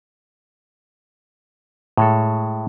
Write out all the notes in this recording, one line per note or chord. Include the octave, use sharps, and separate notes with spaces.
A2 G#3 A4